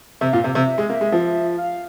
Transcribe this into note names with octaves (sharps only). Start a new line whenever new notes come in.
C3 E5
A#2 F5
C3 E5
C3
G#3
A#3
G#3
F3
F5